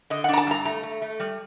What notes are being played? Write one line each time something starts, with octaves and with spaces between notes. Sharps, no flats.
D3 D#5
F#5
D4 A#5
A5
G2 A#5
A3 A#5
A3
A3
G3